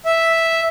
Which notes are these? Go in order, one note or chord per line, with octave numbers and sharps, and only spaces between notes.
E5